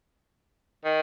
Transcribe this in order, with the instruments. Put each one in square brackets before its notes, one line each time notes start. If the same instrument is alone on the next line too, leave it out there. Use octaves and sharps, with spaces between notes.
[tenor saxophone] D#3